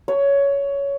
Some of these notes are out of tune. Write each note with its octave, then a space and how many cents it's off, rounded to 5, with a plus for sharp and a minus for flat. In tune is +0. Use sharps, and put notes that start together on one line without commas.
C#5 +15